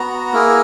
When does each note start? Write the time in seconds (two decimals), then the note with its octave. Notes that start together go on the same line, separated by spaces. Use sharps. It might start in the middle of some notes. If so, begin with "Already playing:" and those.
Already playing: B3 F#4 A#5
0.33 A#3 E4 G#4